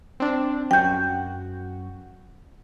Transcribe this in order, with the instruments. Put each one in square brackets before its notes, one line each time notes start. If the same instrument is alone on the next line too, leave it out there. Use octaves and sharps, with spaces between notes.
[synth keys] C4 D4
[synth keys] F#2 F#4 [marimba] G5 G6